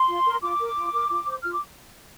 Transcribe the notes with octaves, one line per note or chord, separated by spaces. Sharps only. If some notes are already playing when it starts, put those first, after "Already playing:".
Already playing: C6
F4
A#4
F4 D6
A#4
F4
A#4
F4
C5
F4 F6
D6